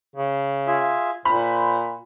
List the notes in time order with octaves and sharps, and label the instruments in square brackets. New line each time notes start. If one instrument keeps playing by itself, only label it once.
[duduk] C#3
[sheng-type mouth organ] F4 G#4 E5
[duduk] A#2 [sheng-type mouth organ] C5 [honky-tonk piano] B5